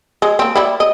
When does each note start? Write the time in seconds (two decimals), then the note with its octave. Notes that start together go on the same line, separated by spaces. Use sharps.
0.22 G#3
0.39 A#3 C4
0.55 G3 E4
0.80 D#5